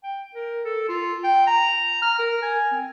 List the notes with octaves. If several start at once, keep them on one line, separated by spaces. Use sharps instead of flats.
G5
A#4
A4
F4
G5
A#5
F6
A#4
G#5
C4